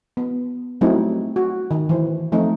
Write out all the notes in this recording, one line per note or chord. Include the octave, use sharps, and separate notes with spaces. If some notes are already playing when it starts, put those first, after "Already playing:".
B3
F#3 G3 A3 C4 D#4 E4
F#4
D#3
E3 C5
F3 A3 C4 D#4